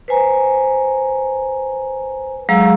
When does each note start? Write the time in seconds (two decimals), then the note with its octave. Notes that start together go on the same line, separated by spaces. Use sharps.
0.08 B4 C5 G#5 A#5
2.49 F#3 G#3 G#4 F5 A#5 E6